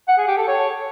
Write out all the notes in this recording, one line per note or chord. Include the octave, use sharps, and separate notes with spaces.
F#5
G#4
G4
A4
C#5